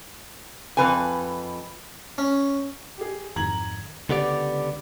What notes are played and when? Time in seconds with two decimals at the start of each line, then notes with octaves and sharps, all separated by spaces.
0.77 F2 B4 G#5
2.18 C#4
2.98 G4 G#4
3.36 F2 G#2 D#3 A#5 G#6 F#7
4.09 C#2 D3 B3 G4 D5